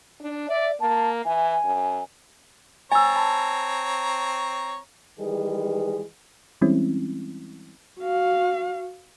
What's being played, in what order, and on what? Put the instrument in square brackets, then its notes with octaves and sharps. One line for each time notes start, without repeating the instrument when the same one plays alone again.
[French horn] D4
[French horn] D5 [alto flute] E5
[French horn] A#3 [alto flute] A5
[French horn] E3 [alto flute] G#5
[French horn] F#2
[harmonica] C4 C#5 A#5 [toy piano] G#5 E6 [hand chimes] A6
[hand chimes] A5 B5
[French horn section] D#3 E3 G3 G#3 G#4 B4
[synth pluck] E3 G3 G#3 C4 C#4 E4
[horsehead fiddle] F#4 F5